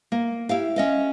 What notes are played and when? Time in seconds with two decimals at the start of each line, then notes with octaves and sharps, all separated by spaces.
0.12 A#3
0.49 E4 G4 F5
0.76 C#4 D#5 F5